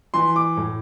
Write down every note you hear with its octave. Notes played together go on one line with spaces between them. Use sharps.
E3 C6
D6
A2